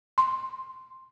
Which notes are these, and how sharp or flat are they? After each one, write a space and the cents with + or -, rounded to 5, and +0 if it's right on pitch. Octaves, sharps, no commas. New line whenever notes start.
C6 +5